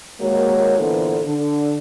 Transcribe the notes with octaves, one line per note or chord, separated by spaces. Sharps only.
D#2 G#3 A#3 F#4 C#5
A#2 D3 E3 B3 A4 C5
D3